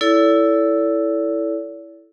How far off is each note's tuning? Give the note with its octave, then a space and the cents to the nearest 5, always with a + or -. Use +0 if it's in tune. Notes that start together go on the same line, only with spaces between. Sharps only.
E4 +0 A4 +0 D5 -45